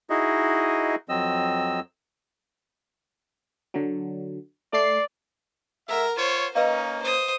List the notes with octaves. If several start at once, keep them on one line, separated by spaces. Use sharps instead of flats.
D#4 E4 F#4 G#4 D#5
F2 F#3 C4 D#5 E6
D3 F#3
A3 D5 C7
G#3 A4 A#4 E5 F#5
F4 C5 C#5
A#3 C#4 D#4 B4 D#5 F5
C5 D#6